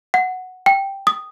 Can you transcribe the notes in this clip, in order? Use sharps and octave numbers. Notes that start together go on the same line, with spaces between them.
F#5
G5
D#6